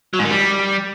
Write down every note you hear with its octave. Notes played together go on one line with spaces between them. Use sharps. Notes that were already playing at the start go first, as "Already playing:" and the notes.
F#3
G#2
D#3
G3